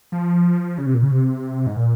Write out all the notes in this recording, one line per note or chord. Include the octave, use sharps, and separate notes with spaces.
F3
C#3
C3
A#2
C#3
C3
G#2
A#2